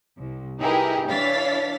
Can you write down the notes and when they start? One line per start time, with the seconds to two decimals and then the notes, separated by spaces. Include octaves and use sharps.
0.16 C2
0.59 D#4 E4 G4 G#4 A#4 B4
1.09 E3 D4 C#5 F5 A6 B6